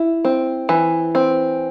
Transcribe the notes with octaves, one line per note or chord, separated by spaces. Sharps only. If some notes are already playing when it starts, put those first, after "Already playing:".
Already playing: E4
C4
E3
C4